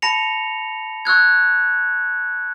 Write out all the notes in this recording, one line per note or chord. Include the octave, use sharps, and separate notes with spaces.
A5 B5 A#6 C#7 F7
C#6 E6 F#6 G#6